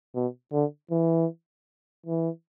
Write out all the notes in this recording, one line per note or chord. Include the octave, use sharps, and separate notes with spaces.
B2
D3
E3
E3